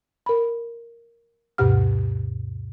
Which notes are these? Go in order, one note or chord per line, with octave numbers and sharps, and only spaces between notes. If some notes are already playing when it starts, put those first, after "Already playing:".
A#4 B5
D2 G2 B2 G4 F#5 F6